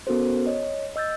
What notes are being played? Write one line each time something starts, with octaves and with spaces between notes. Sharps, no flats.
B3 C#4 F#4 A4 A#4 C5
C#5 D#5
D#5 E6 G6 A6